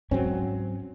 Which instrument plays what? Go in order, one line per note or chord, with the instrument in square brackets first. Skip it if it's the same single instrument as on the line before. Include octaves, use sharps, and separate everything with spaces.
[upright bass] G#2 [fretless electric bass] F#3 C4 C#4